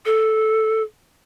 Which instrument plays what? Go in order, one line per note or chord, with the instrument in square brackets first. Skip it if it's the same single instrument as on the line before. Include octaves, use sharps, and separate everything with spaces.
[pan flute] A4